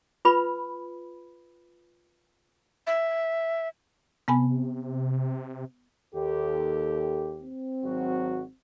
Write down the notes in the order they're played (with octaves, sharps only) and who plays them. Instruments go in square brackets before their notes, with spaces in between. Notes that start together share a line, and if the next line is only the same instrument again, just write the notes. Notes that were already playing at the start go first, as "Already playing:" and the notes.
[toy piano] F4 B4 B5
[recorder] E5
[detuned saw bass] C3 [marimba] B3 G#5 B5
[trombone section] D#2 G4 [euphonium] A4
[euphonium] C4
[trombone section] G#1 F#3 F#4